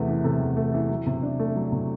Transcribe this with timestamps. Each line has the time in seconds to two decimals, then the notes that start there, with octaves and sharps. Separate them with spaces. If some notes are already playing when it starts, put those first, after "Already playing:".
Already playing: E2 C3 A3 B4
0.08 E3
0.24 C3 A4
0.40 E2
0.57 A3
0.74 E3
0.90 F#3
1.06 C3
1.23 D4
1.39 A3
1.56 F#3
1.72 C3